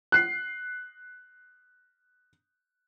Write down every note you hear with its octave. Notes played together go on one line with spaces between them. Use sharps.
F#6 C7